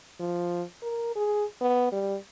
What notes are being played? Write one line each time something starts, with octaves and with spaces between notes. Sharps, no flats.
F3
A#4
G#4
B3
G3